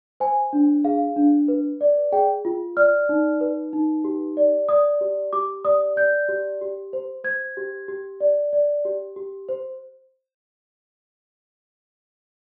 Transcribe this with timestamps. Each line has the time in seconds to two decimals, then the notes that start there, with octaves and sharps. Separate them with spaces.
0.20 C5 G#5
0.53 D4
0.84 G#4 F5
1.16 D4
1.48 B4
1.81 D5
2.12 G#4 G5
2.45 F4
2.77 D5 F6
3.09 D#4
3.41 B4
3.73 D#4
4.04 G4
4.37 D5
4.69 D5 D#6
5.01 G4
5.33 G4 D6
5.65 D5 D#6
5.97 D5 G6
6.29 G4
6.61 G4
6.93 C5
7.24 C5 G#6
7.57 G4
7.88 G4
8.20 D5
8.53 D5
8.85 G4
9.16 G4
9.49 C5